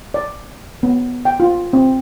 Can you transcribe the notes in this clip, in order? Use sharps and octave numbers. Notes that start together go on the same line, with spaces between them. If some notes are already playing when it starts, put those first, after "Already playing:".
D5
B3
G5
F4
C4